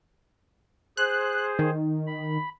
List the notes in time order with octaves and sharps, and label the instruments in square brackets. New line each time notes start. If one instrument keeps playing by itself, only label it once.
[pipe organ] G#4 C5 [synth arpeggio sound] F#6
[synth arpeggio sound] D#3
[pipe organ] B5